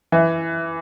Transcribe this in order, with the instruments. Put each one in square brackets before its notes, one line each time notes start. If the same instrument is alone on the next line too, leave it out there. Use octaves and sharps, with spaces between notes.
[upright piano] E3